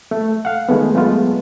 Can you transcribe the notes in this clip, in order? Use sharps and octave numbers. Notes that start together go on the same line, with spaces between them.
A3
F5 F#5
D#3 G#3 A3 B3
F#3 G#3 A3 B3 F4